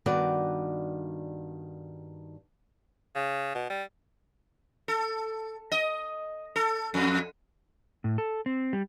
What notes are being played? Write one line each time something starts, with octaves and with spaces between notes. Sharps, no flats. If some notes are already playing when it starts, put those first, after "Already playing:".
G2 D#3 B3 F#4 D5
C#3
B2
G3
A4
D#5
A4
F2
A2
A4
C4
G3